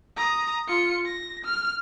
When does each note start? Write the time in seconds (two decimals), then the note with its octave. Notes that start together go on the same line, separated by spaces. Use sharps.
0.17 A#5 D#6
0.67 F4 C#7
1.06 A#6
1.45 F6